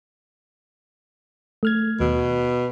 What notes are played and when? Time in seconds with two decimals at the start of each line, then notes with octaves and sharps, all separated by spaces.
1.63 A3 F6 G#6
2.00 D#2 B2